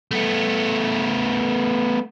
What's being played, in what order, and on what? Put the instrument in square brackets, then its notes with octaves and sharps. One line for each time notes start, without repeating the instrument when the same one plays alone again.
[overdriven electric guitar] A3 B3